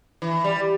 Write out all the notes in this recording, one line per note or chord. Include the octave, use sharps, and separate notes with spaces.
E3
G3